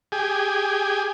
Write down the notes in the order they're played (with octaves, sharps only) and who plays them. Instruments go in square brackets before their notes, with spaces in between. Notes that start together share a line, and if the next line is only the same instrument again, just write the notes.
[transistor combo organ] G4 G#4